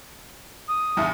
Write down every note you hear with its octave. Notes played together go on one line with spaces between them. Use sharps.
D#6
E2 G2 E5